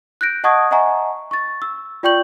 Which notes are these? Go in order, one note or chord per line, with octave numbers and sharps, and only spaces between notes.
F#6 G6 A#6 D7
D#5 F#5 A5 C#6 D#6 G#6
D#5 E5 F#5 G#5 A#5 C#6
C#6 A6
E6
F4 D5 G5 C#6 G6 F#7